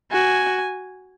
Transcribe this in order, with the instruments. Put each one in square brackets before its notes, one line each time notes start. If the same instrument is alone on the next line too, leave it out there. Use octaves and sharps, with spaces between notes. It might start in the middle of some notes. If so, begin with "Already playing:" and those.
[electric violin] F#4 [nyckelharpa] G#5